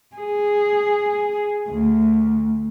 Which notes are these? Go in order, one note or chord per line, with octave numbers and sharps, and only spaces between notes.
G#4
D2